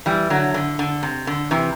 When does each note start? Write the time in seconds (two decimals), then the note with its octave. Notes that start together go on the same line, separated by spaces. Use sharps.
0.06 E3 G3
0.30 D3 F#3
0.54 D3
0.79 D3
1.03 C3
1.27 D3
1.51 C3 E3